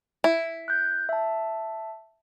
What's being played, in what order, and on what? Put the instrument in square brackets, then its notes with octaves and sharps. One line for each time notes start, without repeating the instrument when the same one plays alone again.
[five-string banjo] E4
[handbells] F#6 G6
E5 A5